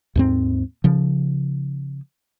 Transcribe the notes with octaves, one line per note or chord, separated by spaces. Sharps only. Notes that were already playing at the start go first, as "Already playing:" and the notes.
D#2 G#2 C4
C#3 F3